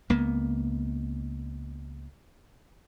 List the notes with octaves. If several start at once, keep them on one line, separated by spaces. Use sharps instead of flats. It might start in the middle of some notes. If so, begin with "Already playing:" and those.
C#2 A#3 B3